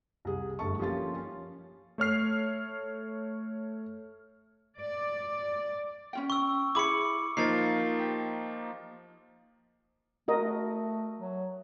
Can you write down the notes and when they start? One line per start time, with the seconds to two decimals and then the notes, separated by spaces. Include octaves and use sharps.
0.25 C2 G#4
0.59 G1 G2 A3 A5 C#6
0.79 F3 A#3 C#4 F4 G4 A6
1.14 C#4
1.98 A3 C#5 F6 C7
4.76 D5
6.13 C#4 F4 G5
6.30 C#6 E6
6.75 E4 G#4 B5 D6 C#7
7.37 F3 A#3 D#4 A#4 C#5 A6 C7
7.99 G4
10.28 A3 F#4 A#4 D#5
10.41 A3
11.20 F#3